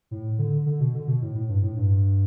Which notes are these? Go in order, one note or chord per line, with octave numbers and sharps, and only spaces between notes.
A2
D3
D3
B2
D3
B2
A2
A2
G2
A2
G2